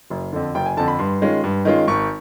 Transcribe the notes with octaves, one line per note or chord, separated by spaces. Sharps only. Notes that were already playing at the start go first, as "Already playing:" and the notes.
F#1
F2 D3
F#1 G5
G#5
F2 D3 A5
B5
G2 C6
D#3 G#3 C#4 F4
G2
D#3 G#3 C#4 F4
G#1 C#6